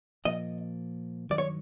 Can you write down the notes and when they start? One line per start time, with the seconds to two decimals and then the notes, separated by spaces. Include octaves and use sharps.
0.25 A#2 F3 A#3 D#5
1.30 G2 D#3 F#3 D5
1.38 C#5